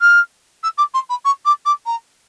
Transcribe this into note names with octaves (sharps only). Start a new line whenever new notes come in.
F6
E6
D6
C6
B5
C#6
D6
D6
A#5